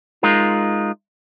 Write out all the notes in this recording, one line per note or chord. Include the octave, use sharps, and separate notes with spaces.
G#3 D#4 F4 A#4